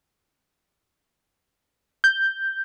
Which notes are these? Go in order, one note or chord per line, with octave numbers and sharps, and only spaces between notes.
G6